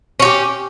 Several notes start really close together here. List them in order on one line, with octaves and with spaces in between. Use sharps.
C#4 F#4 G4